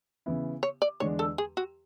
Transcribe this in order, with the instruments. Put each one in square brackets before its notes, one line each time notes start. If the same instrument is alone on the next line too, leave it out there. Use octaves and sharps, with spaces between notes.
[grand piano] C#3 E3 B3 E4
[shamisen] C#5
D5
[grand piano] E2 D3 G#3 D4 [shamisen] C#5
[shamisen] A4
G#4
F#4